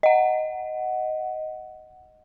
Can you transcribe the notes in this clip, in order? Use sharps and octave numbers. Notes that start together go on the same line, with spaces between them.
D#5 F#5